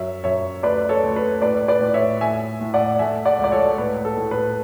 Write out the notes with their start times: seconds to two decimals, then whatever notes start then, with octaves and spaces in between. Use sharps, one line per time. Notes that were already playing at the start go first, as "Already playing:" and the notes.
Already playing: F#2 C#5 E5
0.24 F#2 C#5 E5
0.63 D2 B4 D5
0.89 A4 C#5
1.03 D2
1.16 B4
1.42 A2 B4 D5
1.68 B4 D5
1.81 A2
1.94 C#5 E5
2.21 A2 E5 G#5
2.61 A2
2.74 D5 F#5
2.99 A3 E5 G#5
3.25 D5 F#5
3.39 C#2
3.44 D5
3.52 A4 C#5
3.78 A2 B4
4.05 A4
4.17 A2
4.31 B4